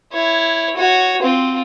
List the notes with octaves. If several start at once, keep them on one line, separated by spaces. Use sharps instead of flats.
E4 C#5
F#4 C#5
C4 F4